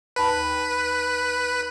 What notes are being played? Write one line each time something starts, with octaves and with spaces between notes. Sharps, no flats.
D#2 B4 A5 B5